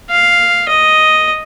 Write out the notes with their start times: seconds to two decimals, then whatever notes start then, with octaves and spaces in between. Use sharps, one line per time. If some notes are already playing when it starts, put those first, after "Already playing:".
0.10 F5
0.69 D#5